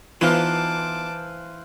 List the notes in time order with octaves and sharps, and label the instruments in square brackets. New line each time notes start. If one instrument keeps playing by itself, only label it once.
[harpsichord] E3 [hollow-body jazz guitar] B3 D#4 F4 [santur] C5 F5 [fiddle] A5 D6